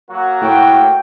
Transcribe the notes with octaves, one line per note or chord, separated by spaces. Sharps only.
F#3 A#3 F#4
A2 G5